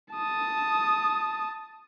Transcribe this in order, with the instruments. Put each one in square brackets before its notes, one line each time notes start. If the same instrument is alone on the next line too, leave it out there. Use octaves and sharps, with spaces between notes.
[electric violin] A5 D#6